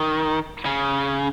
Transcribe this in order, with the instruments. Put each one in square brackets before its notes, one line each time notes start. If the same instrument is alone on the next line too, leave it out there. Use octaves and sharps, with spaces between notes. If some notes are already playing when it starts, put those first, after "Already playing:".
Already playing: [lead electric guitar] D#3
C#3